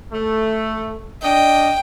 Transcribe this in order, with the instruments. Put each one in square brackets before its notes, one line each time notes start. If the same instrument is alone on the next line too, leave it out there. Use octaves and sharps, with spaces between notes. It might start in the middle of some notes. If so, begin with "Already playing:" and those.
[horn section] A3
[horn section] D4 D#5 [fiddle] G5